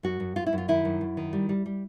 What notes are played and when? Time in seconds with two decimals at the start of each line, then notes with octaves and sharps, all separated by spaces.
0.03 F#2 F#4
0.20 F#2
0.36 F#2 F4
0.46 E4
0.53 F#2 F4
0.68 D#3 E4
0.85 F#2
1.01 F#2
1.17 D#3
1.33 G3
1.49 G3
1.66 G3